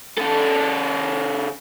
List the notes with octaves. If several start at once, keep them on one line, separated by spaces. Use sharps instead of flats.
C#3 A4